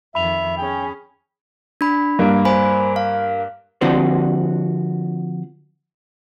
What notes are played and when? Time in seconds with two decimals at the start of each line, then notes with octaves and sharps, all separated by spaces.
0.15 F2 D#3 E5 B5 F7
0.58 C#4 G#4 G5
1.81 D4 B5
2.19 G2 A#3
2.45 C5 G#5 B5
2.96 F5
3.81 D3 F3 C4 D4 F#4 C5